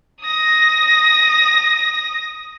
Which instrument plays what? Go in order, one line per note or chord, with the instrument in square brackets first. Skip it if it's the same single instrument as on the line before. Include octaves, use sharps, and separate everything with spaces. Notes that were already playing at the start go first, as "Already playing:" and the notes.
[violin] D#6 A#6